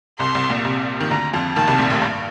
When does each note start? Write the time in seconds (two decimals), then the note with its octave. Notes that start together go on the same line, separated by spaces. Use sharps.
0.19 C2 C3 C6
0.35 C2 C3
0.50 A#1 A#2
0.65 C2 C3
1.01 D#3
1.10 D2 D3 A#5
1.33 F2 F3
1.56 D#2 D#3 A5
1.67 C2 C3
1.78 A#1 A#2
1.90 A1 A2
2.02 G2